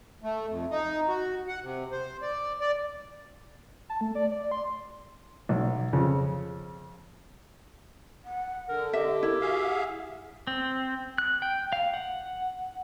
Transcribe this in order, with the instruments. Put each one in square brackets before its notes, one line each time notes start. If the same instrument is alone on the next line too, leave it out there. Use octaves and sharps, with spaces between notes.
[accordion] A3
F2
D#4
F#4
F#5
C3
C5
D5
D5
[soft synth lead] A5
A3
D5
D5
C6
[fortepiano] B1
F2 C#3
[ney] F#5
[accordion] D3 [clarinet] A#4
[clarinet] G4 [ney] D#5 [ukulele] E5
[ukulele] E4 [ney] A#4
[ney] F#4 [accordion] G#4 E5 F5
[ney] F#5
[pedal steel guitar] C4
F#6
G5
F5
F#5